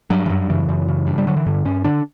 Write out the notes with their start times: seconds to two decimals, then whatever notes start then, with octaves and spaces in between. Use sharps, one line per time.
0.10 G2 F#3
0.26 E3
0.30 F#2 F#3
0.50 C#3 E3
0.69 F#2
0.88 C#3
1.07 G2
1.18 G3
1.27 D3 F#3
1.37 E3
1.46 G2 D3
1.65 G2 C#4
1.84 D3 D4